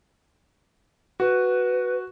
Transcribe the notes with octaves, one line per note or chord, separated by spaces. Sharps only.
F#4 B4